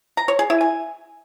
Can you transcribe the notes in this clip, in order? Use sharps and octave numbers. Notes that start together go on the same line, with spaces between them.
A#5
C#5
G#4
E4
G#5